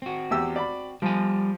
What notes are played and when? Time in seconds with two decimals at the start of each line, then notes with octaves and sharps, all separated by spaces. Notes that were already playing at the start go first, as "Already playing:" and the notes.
0.02 C4 F#4
0.31 E2 G4 E6
0.56 D5 B5
1.02 F3 G3 G#5